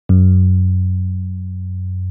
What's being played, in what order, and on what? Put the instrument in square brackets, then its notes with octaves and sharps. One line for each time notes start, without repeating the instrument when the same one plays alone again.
[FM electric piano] F#2